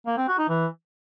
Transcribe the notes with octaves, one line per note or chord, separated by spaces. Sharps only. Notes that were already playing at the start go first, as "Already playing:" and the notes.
A#3
C4
F#4
D#4
E3